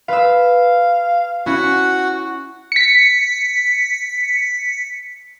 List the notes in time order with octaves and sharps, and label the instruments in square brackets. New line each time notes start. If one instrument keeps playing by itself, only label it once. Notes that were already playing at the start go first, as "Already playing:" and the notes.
[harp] B4 E6 [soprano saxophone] F5
[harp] C#4 E4 [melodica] F#4 F#5
[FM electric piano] B6 C#7